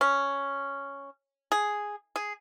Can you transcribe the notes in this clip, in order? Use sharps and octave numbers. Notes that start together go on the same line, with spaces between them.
C#4
G#4
G#4